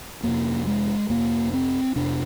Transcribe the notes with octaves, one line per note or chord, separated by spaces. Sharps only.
F2 C3 A#3
G#3
F2 C3 A#3
C4
F2 C3 D4